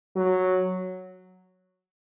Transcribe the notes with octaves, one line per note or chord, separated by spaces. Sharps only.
F#3